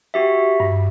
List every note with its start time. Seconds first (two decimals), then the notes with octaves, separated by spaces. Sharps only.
0.14 F#4 G4 E5
0.60 G2